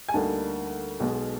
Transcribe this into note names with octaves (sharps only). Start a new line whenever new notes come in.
G#5
D2 D3 G3 A#3 D#4 A5
B1 B2 G#3